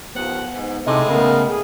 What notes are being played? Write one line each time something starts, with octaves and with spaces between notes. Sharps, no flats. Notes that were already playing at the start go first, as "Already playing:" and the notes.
D#2 F3 B3 F#5
G#2
A2 C3 G#3 D#4 A4
C#3 A3 B3 A#4 F5
G#4